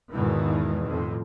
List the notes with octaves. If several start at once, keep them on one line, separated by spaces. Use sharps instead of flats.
E2 G#2 B2 D#3 E3
F2 A2